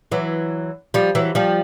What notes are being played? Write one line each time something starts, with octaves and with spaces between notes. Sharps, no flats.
E3 F#3
F3 G3
E3 F#3
F3 G3